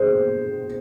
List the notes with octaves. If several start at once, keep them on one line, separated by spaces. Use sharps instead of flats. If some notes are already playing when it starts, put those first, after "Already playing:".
Already playing: G#4 C5